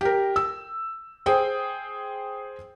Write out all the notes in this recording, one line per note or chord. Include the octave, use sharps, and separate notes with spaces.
G4 A#4
E6
G#4 C5 G5